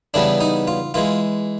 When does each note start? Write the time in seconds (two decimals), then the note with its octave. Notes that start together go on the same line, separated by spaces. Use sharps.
0.14 C#3 E3 G3 B3 D4
0.41 D#4
0.67 F4
0.94 E3 G#3 F4